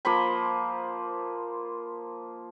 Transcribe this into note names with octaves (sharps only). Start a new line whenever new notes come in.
F3 A#3 C5 B5